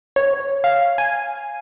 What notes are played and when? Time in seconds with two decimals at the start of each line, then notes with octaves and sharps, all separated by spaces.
0.16 C#5
0.64 F5
0.98 G#5